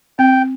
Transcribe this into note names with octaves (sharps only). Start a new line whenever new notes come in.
C4 G5